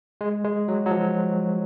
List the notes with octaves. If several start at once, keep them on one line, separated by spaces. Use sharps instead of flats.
G#3
G#3
F#3
F#3
F3